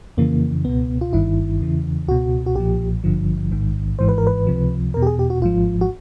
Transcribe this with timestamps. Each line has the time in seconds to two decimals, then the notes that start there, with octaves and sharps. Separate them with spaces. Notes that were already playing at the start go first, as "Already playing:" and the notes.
0.17 F2 C#3 E3 A#3
0.65 C#2 B2 B3
1.01 F4
1.13 G1 G2 D#3 E4
1.61 E2 C#3 E3
2.08 C#2 B2 F#4
2.46 F#4
2.55 B1 A#2 F3 G4
3.04 G#1 G2 D3 F3
3.52 A1 G#2 D#3
3.99 G#1 G#2 E3 C5
4.09 B4
4.18 A#4
4.27 B4
4.47 C#2 C3 F3
4.94 E2 B2 A#4
5.02 G4
5.07 G#4
5.19 G4
5.30 F#4
5.42 G#1 G#2 F3 F4
5.81 F#4